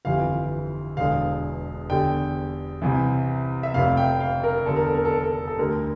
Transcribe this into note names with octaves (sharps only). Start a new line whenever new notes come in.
G1 F2 E3 G3 F5
E1 E2 D3 F5
E2 D3 G3 G5
C2 C3 E3
E5
F1 F2 C3 F5
G5
F5
A#4
E2 D3 G3 A4
A#4
A4
A#4
A4
A#4
A4
A4
D2 D3 G3 A#4